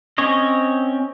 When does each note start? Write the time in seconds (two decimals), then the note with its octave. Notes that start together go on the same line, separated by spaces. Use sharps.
0.18 C4 C#4 C#5 D#5